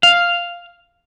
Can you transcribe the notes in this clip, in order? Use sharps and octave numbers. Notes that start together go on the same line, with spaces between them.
F5